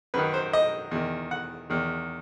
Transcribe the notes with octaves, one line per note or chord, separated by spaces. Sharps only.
F#2 D#3 B4
C5
D#5
E2 D#3
F#5
E2 D#3